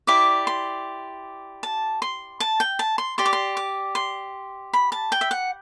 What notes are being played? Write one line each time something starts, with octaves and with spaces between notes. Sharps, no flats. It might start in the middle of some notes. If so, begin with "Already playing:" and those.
E4 G4 D5 D6
C6
A5
C6
A5
G5
A5
C6
G4 D5 C6
D6
C6
D6
C6
B5
A5
G5
E5
F#5